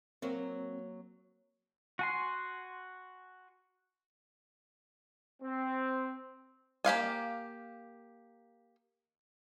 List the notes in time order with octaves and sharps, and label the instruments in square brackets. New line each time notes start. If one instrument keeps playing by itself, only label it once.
[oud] F#3 A#3 [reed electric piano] C4
[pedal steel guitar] F#4 G#5 C6
[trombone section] C4
[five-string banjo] A#3 G4 F5 G#5